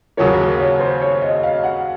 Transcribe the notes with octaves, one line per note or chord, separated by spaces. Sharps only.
D#2 C#3 F#3 A#3 C#5
C#5
C5
C#5
D#5
F5
F#5